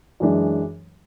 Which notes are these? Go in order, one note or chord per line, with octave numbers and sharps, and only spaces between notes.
F#2 E3 G#3 D4 G#4